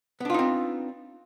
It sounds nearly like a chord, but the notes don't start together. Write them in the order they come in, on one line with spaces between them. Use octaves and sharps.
B3 D4 F4 D#4 C4